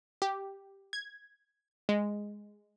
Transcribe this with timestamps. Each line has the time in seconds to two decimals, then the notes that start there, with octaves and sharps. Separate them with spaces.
0.22 G4
0.93 G#6
1.89 G#3